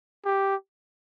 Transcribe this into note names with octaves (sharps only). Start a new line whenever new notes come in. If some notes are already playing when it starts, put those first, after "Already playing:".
G4